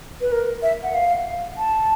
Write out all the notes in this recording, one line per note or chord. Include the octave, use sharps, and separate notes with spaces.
B4
A#4
E5
F#5
F5
A5